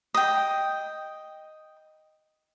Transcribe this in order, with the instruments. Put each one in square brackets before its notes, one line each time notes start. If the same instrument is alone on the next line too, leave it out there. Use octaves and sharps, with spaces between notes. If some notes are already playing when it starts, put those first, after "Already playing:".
[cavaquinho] D#5 G5